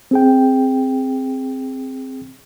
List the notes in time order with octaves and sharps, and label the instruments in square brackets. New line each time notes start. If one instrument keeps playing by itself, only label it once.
[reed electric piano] C4 G#4 G5